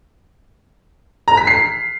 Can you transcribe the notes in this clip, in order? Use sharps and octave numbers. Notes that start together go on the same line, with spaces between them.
A#5
B6
C7